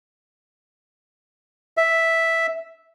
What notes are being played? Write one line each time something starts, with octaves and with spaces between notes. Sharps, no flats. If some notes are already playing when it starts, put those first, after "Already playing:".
E5